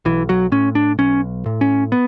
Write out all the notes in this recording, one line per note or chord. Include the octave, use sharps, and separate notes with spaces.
B1 E3
F#3
A2 C#4
D4
B1 C#4
A2
C#4
B3